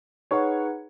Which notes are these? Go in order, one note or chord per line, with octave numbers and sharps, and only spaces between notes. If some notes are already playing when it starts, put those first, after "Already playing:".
D#4 G#4 B4 C#5 F#5 C#6